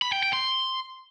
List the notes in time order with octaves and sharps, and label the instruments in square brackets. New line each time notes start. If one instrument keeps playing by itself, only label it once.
[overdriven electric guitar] B5
G5
G5
C6